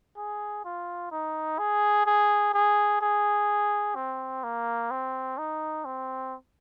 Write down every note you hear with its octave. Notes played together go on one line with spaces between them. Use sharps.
G#4
F4
D#4
G#4
G#4
G#4
G#4
C4
A#3
C4
D#4
C4